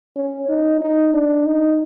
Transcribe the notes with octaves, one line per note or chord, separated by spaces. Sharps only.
C#4
D#4
D#4
D4
D#4